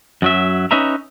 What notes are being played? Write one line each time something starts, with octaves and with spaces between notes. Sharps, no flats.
F#2 F#3 E5
C#4 D#4 B4 E5 A#5